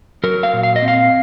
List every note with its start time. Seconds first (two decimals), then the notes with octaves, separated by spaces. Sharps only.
0.24 F#3 A#4
0.43 F5
0.53 A#2
0.63 F5
0.76 D#5
0.82 C4
0.88 F5